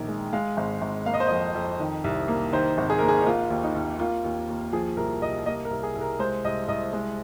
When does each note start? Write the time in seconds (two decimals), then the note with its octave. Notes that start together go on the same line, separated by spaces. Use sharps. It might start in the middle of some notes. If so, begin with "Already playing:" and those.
Already playing: A#1 D#3 A#4
0.08 G#3
0.33 G#3 F5
0.57 G#1
0.82 G#1
1.06 A#3 F5
1.14 D#5
1.20 C5
1.27 F2 D#5
1.55 F2
1.80 D#3
2.04 C2
2.28 A#3
2.53 D#3 C5
2.78 G#1
2.90 G#4
2.99 A#3 A#4
3.08 G#4
3.22 D#4
3.26 A#3 F4
3.50 D#2
3.63 D#4
3.75 D#2
3.99 A#3 F4
4.24 D#2
4.48 D#2
4.73 F3 G#4
4.97 C2 A#4
5.22 C2 D#5
5.46 A#3 D#5
5.65 A#4
5.71 C2
5.83 G#4
5.95 C2
6.01 A#4
6.19 G#3 C5
6.44 C2 D#5
6.68 C2 D#5
6.93 G#3